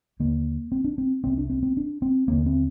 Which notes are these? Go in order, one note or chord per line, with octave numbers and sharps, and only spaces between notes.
D#2 D3 A#3
C4
D4
C4
C2 C3 C4
D4
C4
C4
D4
C4
D#2 D3 A#3
C4